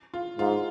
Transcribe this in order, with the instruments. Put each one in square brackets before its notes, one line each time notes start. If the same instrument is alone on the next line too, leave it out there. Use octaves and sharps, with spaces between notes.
[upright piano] F4
[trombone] G#2 [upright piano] F4